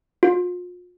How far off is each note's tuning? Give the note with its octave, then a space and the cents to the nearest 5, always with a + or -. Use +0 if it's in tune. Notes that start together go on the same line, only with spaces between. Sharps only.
F4 +40